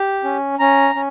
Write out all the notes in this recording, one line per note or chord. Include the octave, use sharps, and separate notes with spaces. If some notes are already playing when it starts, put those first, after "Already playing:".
Already playing: G4
C#4
C#4 A#5
C#4